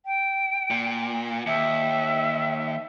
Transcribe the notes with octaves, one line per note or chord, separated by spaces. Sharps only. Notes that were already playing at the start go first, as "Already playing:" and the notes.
G5
A#2
D#2 E5